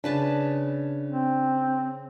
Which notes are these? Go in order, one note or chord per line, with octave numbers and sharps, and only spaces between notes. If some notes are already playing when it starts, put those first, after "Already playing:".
C#3 D4 B4 A5
C4